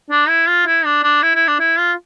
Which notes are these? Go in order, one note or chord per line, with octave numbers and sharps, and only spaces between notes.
D4
E4
F4
E4
D4
D4
E4
E4
D4
E4
F4